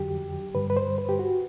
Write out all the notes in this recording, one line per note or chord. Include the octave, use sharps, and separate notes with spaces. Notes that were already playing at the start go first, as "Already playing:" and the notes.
Already playing: F2 D3 F#3 G4
G2 D3 G3 B4
B4
C5
B4
G4
F#4